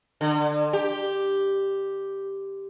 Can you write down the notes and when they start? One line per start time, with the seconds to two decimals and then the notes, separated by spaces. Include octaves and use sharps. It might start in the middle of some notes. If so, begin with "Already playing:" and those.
0.21 D3
0.73 G4